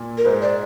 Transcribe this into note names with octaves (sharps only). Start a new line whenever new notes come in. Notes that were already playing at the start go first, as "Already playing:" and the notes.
Already playing: A#2
A#4
G#2 C5
D5